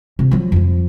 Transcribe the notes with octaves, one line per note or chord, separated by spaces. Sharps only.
C3
F3 F#3
F2 F3